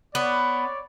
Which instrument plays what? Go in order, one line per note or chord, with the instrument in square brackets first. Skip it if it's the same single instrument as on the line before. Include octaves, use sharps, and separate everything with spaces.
[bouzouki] B3 [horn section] C#5 D5